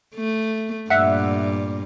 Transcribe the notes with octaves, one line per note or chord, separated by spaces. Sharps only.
A3
G2 A#2 E5 F#5